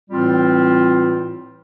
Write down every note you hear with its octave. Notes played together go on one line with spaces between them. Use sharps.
A2 E3 G3 C4 F4